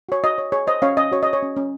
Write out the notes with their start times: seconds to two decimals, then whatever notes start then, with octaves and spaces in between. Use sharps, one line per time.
0.09 F#4 C#5
0.24 F#4 D#5
0.38 C#5
0.52 G#4 C#5
0.67 C5 D#5
0.82 C#4 C#5 F5
0.97 C#4 D#5
1.12 F#4 C#5
1.23 C#5 D#5
1.33 C#5
1.43 C#4
1.56 C#4